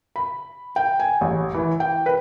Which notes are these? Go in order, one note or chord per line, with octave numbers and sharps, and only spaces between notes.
B5
G5
G#5
A1
E3
G5
B4